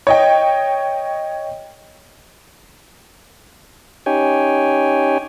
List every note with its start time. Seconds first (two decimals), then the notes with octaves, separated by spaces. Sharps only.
0.07 C#5 D#5 G5
4.06 C#4 D#4 G4 C#5 G5 G#5